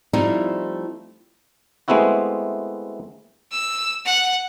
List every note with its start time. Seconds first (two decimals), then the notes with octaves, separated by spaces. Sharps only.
0.13 F3 G3 A3 C4 D#4 E4
1.88 G#3 A3 B3 C4 E4 F#4
3.52 E6
4.06 F#5